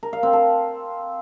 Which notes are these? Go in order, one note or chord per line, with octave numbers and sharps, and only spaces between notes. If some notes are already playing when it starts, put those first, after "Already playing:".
A#4
F5
C4
A4